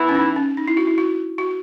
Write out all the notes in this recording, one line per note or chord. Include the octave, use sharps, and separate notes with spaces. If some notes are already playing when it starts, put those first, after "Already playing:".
Already playing: E3 B3 E4
C#4
D#4
C#4
D#4
E4
F#4
E4
F#4
F#4